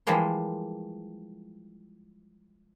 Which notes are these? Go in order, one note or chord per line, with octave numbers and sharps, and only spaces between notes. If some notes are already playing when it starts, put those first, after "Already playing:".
E3 F3 G3 G#3 A#3 C5